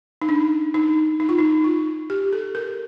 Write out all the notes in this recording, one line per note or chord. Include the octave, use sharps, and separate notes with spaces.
D#4
D4
D#4
D#4
F4
D#4
F4
G4
A4
A#4